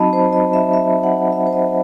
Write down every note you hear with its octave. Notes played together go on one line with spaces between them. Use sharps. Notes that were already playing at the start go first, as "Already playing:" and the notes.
Already playing: F#3 C4 D#4 F#4 D#5 A5 B5
C5
D#5
E5
E5
F#5
E5
C5
D#5